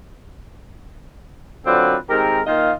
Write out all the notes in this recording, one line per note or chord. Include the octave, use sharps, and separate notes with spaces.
D3 F#3 C4 F4 B4 D5
D#3 G#3 C4 G4 A#4
D#3 A#3 F4 D#5 F5